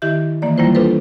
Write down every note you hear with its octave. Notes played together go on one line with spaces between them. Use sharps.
D#3 E4 G4 E5 G6
D#3 E3 A#3 D5
F#3 G3 A#3 E4 F4 C5
D4 F4 A4 B4 C5